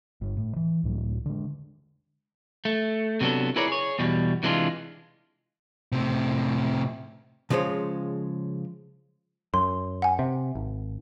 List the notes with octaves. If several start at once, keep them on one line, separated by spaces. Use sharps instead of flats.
G1
A2
E3
C#2 A2 F#3
D3 G#3
A3
C3 F#3 B3 D4 A4
E4 G#4 A#4 B4 C#5 D5
G#4 C#5
E2 B2 G3
C3 E3 G#3 D4 E4 F4
A2 C3
C#3 F3 G#3 C5 C#5
F#2 C6
F#5 G#5
C3
G#1